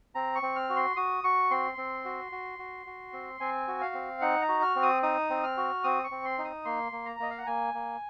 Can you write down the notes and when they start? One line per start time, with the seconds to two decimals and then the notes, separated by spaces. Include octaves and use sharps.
0.15 C4 A#5
0.35 C#6
0.43 C4
0.56 F6
0.70 F#4
0.76 C6
0.96 F#4 D#6
1.24 F#4 C#6
1.51 C4 C6
1.78 C4
2.05 F#4
2.32 F#4
2.59 F#4
2.86 F#4
3.13 C4
3.40 C4 G#5
3.68 F#4
3.81 F5
3.94 C4
4.21 D#4 F#5
4.42 A#5
4.48 F#4
4.62 F6
4.76 C4
4.83 D#6
5.03 D#4 D#6
5.30 C4
5.44 F6
5.57 F#4
5.84 C4 D#6
6.04 C#6
6.11 C4
6.25 C6
6.38 D#4
6.44 D#6
6.65 A#3 C6
6.92 A#3
7.05 A#5
7.20 A#3 D#5
7.30 F5
7.38 F#5
7.46 A#3 G#5
7.74 A#3